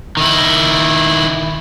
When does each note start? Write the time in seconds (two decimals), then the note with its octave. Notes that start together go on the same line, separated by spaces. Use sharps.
0.17 D#3 E4